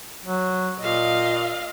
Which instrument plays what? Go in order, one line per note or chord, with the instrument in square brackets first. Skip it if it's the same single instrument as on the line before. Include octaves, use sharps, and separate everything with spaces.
[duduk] F#3
[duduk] A#2 [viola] D#5 F5